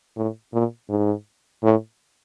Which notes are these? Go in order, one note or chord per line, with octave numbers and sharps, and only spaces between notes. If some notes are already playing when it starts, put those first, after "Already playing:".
A2
A#2
G#2
A2